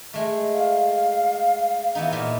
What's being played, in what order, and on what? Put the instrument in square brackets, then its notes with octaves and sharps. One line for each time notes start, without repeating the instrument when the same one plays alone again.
[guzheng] G#3 A3
[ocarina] F5
[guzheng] E3 B3 D#4
A#2 B3